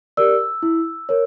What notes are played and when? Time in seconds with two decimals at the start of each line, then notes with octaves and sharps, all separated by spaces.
0.17 G4 A#4 D5 E6
0.63 E4
1.09 A#4 C#5